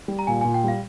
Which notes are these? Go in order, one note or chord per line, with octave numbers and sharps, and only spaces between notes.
G3
A#5
A#2 G#5
A#2 G#5
G5
G3 F5